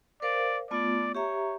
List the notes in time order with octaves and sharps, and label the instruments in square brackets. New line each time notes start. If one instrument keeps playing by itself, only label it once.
[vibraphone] A#4 C5 F5 [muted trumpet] D5
[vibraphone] A3 B3 F4 [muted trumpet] D5
[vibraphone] G4 E5 A#5 [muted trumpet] C#5